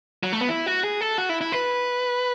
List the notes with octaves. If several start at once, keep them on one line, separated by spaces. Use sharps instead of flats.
F#3
A3
B3
E4
F#4
G#4
A4
F#4
E4
E4
B4